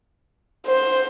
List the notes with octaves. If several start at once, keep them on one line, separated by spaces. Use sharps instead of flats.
C5